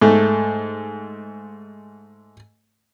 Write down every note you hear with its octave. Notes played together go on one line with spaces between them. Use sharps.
G#2 A3